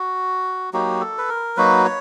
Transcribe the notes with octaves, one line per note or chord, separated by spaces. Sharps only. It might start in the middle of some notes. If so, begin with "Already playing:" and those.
Already playing: F#4
F#3 A#3 D#4 F#4 G4
A4
B4
A#4
F#3 A#3 D#4 F#4 B4
C#5